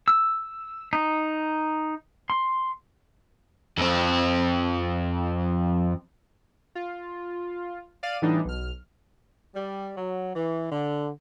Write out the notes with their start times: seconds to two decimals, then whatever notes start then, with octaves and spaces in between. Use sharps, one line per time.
0.08 E6
0.93 D#4
2.30 C6
3.78 F2 C4
6.75 F4
8.03 D5 F5 D#7
8.22 A2 E3 G3 B3 D4 D#4
8.45 B1 F6
9.56 G3
9.97 F#3
10.36 E3
10.72 D3